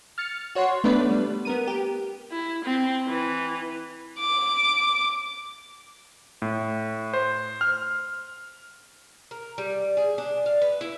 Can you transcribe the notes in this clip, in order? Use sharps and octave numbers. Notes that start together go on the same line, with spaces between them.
F6 A6 C#7
F#4 C#5 F#5 C6
A3 B3 D4 B4 D5
G3
B3 A#4 D#7
G4
E4
C4
E3
D6
A2
C5
F6
A#4
G3
G#4
D4
F5
B4
E4